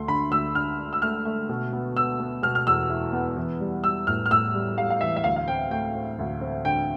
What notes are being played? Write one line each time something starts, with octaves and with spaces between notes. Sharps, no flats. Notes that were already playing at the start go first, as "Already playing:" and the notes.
Already playing: D2 A3 C6
D3 B5
D2 E6
D3 F6
D4
E6
A3 F6
A3
B2
B3
B3 E6
B3
B2 F6
F6
E2 E6
E4
B3
E3
G3
G3 E6
A2 F6
F6
A2 E6
G3
G3 F5
F5
E3 E5
E5
D2 F5
F5
C4 G5
A3 G5
C4
D2
C4
D3 G5